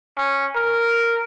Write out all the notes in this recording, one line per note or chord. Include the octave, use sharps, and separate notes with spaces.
C#4
A#4